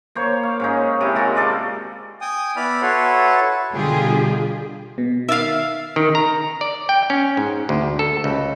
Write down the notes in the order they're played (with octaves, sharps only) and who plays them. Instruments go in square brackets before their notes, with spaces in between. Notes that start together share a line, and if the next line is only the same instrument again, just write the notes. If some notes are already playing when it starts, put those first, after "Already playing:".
[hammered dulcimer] A#3 C5 C#5
F5
G#2 C#4 D#4
C3 E4
G#3 F4 F#4 A#4
A4 D5 F5
[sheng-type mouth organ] G5 G#5 D#6
B3 E4 D5 B5 F6
E4 F#4 A4 B4 C#5 C6
[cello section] B2 D3 G3 F4 G4 G#4
[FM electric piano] B2
[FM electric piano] D#3 A6 C7 [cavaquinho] E5 F5
[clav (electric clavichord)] D#3
A#5
D5
G5
C#4
G#2
D2
A4
C#2